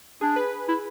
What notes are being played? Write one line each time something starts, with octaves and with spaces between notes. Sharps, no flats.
D4 G#4
B4
E4